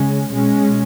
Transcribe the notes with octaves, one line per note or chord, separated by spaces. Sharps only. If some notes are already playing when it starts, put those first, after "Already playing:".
Already playing: C#3 G#3 C#4
B2 G#3 C#4